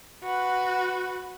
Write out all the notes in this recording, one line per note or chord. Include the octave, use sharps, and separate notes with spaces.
F#4 B4